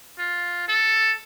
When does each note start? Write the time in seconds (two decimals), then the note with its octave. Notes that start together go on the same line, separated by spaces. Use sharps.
0.19 F4
0.68 A4